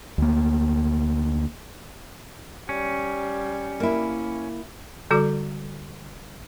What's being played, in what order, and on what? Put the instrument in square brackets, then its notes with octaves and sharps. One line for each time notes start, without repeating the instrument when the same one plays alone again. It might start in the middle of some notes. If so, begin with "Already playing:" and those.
[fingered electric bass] D2 A#3
[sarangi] G3 [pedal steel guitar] C#4
[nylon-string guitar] A#3 E4
[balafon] D3 G3 F#4 A4 D5